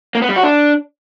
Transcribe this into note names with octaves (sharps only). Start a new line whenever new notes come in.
A#3
B3
G3
F#4
D4